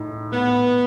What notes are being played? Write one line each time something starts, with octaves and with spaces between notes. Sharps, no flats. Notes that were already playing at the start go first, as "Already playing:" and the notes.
Already playing: A2 D#4
A2 B3